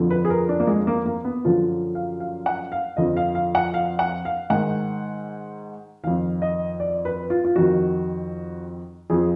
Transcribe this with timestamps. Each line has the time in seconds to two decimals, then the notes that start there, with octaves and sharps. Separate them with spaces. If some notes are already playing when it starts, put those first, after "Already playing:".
Already playing: F2 D3 F3
0.10 B4
0.25 G#4
0.30 A#4
0.49 D4
0.60 A#3
0.67 G#3
0.87 A#3
1.06 A#3
1.25 B3
1.45 F#2 D3 F3 F4
1.95 F5
2.20 F5
2.46 F#5
2.72 F5
2.97 F2 D3 F3 D#5
3.17 F5
3.35 F5
3.55 F#5
3.74 F5
3.99 F#5
4.25 F5
4.50 G#2 D#3 F#5
6.03 F2 D#3 F5
6.42 D#5
6.80 D5
7.05 B4
7.30 F4
7.44 F4
7.56 F2 D#3 F#4
9.10 F2 F3 G#4